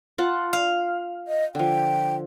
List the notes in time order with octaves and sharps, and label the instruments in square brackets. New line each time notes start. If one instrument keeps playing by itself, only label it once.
[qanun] F4 F#5 A5
[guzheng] F5
[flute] D#5
[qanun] D3 F3 [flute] G5